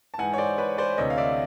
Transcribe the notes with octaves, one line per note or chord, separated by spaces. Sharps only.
A5
G#2 E3 F#5 G#5
C#5
C5 D5
B4 C#5
C5 D5
D2 C3 E3 C#5 D#5
F5
D5 E5